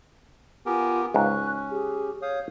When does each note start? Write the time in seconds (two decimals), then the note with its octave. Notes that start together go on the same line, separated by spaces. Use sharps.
0.66 B3 F4 G4 A#4 G#5
1.14 C#2 G#2 C#4 C#6 F#6
1.69 G4 G#4
2.22 C#5 F5 D#6 G6